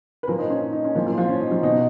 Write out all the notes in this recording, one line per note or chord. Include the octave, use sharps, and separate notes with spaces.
B4
A#2 F3 A#3 A#4
D#4
C#4
D#4
D#4
C#4
A#2 F3
F3 F4
F3 F4
C#4
D#4
F3 F4
B2 D#4